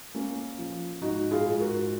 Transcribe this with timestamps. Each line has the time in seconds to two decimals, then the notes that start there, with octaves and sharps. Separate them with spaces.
0.15 A#3 C#4
0.58 F3
1.02 G#2 D#4 F#4
1.31 F4 G#4
1.46 G#2
1.60 F#4 A#4